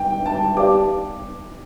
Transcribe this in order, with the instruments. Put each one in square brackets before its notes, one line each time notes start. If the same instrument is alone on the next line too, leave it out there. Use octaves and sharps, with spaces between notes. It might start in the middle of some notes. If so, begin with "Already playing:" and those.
Already playing: [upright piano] G5
A5
[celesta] G4 B4 D5 F5 A5 [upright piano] D6